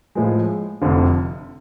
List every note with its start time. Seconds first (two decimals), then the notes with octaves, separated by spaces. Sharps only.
0.15 A2 F3 G#3
0.82 F1 F2 D3